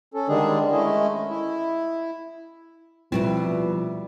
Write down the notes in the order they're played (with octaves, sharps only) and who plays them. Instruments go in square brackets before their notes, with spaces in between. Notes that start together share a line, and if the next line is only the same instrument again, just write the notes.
[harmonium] C#4 A4
D3 D#3 G3 G#3 D4 G#4
G#3 A3 C#4 E4 D#5
E4
[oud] D2 B2 C4 [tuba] F3 [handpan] G3 E4